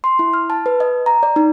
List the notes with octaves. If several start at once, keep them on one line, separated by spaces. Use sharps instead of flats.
C6
E4
F6
A5
B4
D#5
A#5
D5
D#4